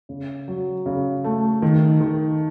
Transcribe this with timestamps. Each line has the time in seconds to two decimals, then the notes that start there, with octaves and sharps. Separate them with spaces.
0.09 C#3
0.48 F#3
0.86 C#3
1.24 A3
1.62 D#3
2.00 D#3